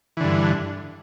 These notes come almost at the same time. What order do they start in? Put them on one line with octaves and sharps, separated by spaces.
E3 D3 G2